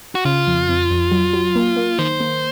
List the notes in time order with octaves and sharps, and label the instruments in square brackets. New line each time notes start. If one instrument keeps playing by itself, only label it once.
[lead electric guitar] F#4
[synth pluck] C#3 [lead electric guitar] F4
[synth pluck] F2
F2
F2
F#3
F#3
A#3
A#3
[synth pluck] D#3 [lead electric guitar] C5
[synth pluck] A#3